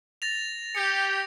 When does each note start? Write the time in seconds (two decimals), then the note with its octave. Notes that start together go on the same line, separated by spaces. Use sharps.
0.22 A6 A#6 F7
0.75 G4 C#7